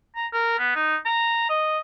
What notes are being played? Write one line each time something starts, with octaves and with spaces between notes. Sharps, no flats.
A#5
A#4
B3
D#4
A#5
D#5